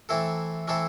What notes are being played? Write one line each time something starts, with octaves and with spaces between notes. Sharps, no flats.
E3 A3 C4 E4 A4
E3 A3 C4 E4 A4